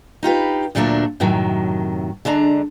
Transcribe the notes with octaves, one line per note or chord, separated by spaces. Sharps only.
D#4 F4 G4 B4
D2 A#2 F#3 A3 D4 A#4
F#2 A2 C3 D#3 F#3
D3 G#3 D4 A#5